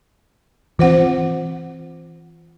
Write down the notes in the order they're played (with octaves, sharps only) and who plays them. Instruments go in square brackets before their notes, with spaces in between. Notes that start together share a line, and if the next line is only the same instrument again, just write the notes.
[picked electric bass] E3 C4 [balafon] F4 C5 F#5